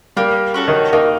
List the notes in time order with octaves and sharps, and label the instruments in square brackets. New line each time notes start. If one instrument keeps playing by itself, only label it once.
[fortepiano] G3 G4 [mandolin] A#3
[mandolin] C#4 F#4 A4
[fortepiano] D#3 D#4
[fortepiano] D#3 D#4 [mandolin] A#3